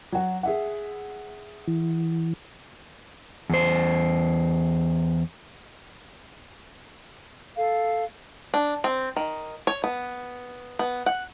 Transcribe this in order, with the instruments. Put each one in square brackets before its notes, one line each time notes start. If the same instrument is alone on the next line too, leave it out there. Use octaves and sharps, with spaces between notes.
[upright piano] F#3 F#4
G#4 E5 F#5
[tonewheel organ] E3
[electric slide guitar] E2 C5
[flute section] A4 F5
[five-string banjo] D4
C4
D#3
C#5
B3
B3
F#5